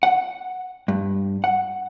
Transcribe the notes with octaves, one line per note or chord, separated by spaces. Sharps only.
F#5
G2
F#5